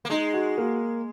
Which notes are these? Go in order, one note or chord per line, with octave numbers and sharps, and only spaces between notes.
A#3
G#3 D#4
F#4
A#3